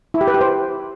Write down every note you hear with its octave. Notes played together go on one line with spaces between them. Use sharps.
E4
G4
B4
G4
C5